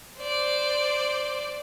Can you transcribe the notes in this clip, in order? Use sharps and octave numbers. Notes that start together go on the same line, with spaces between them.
C5 D5